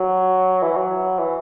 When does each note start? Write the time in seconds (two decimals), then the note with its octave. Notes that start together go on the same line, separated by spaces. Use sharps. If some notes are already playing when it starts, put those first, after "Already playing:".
Already playing: F#3
0.63 E3
0.77 F#3
1.19 E3